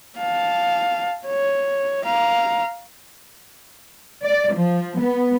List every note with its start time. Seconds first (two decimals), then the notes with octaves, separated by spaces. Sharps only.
0.17 F5 A5
1.26 C#5
2.05 F5 A#5
4.23 D5
4.52 F3
5.00 B3